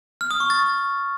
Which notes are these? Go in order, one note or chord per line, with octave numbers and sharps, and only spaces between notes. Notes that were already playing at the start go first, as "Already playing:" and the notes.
F6
D#6
C#6
A6